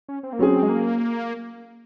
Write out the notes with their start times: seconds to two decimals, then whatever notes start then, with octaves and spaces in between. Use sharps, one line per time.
0.09 C#4
0.23 C4
0.33 A#3
0.39 F#3 C4 C#4 G#4
0.63 G#3
0.69 A#3